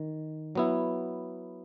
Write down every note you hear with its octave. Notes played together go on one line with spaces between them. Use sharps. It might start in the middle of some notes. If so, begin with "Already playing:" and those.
Already playing: D#3
F#3 B3 E4